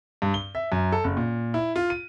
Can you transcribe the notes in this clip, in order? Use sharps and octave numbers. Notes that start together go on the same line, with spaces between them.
G2
G7
E5
F#2
A4
F#1
A#2
E4
F4
D#7